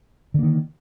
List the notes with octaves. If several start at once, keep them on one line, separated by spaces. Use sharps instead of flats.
D3 D#3 A#3